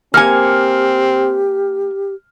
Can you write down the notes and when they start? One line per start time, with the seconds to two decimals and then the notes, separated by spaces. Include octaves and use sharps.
0.14 A#3 C4 G4 G#5 F6 C#7